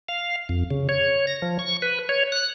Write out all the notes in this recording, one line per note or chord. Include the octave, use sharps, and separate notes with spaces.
F5
F2
C#3
C#5
A#6
F3
C#6
B4
C#5
F#6